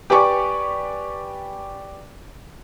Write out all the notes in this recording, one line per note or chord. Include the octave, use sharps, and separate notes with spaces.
G4 B4 D5 G#5 C#6 D6